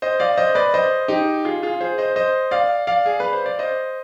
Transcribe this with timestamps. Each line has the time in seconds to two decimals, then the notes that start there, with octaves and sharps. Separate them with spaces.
0.02 C5 D#5
0.20 D5 F5
0.37 C5 D#5
0.55 B4 D5
0.74 C5 D#5
1.08 D#4 G4
1.45 F4 G#4
1.62 F4 G#4
1.81 G#4 C5
1.98 C5 D#5
2.16 C5 D#5
2.51 D5 F5
2.87 D5 F5
3.06 G#4
3.20 B4
3.33 C5
3.46 D5
3.59 C5 D#5